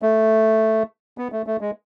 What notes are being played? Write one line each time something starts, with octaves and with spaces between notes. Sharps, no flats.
A3
B3
A3
A3
G#3